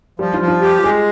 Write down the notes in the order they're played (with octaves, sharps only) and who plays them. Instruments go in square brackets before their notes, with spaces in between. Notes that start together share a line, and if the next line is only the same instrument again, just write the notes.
[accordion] F3 [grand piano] G3
[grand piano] F4
[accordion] F3
[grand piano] F4
[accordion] G4
[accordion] G#3 [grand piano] G#4